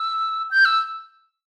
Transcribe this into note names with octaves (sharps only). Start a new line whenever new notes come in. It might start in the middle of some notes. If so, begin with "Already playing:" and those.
Already playing: E6
G6
E6